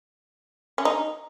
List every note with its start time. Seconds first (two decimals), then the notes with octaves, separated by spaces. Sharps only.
0.78 C#4
0.85 D#4